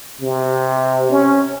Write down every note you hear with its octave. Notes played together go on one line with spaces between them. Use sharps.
C3
C#4